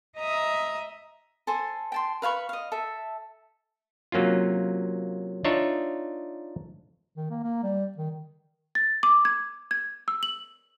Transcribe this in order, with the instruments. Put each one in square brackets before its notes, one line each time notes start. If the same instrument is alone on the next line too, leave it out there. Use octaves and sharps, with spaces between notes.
[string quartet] D#5 E5 A#5 D#6
[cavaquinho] A4 C5 G#5
G5 A5 C6
B4 F5 B5 C#6
D#5 F5
A4 E5
[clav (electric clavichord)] C3 F#3 A#3 C#4 F4
D4 D#4 F4 C#5 E5
[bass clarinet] D#3
A#3
A#3
G3
D#3
[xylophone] A6
D6
G#6
G#6
E6
F#7